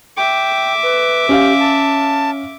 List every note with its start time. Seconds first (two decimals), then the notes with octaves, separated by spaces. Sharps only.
0.17 E5 G5 D6
0.83 B4
1.29 C#4 G4 F5
1.59 A5